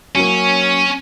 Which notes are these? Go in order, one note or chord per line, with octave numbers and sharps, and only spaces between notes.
F#3 A#3 C#4